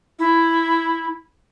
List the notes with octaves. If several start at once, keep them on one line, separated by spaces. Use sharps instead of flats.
E4